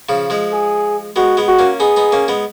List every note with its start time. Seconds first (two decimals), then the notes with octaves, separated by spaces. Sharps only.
0.09 C#3 F3
0.30 F3 G#3
0.52 G#4
1.16 G#3 B3 F#4
1.37 G#3 B3
1.48 F#4
1.59 A#3 C#4
1.80 B3 D#4 G#4
1.96 B3 D#4
2.12 A#3 C#4
2.28 G#3 B3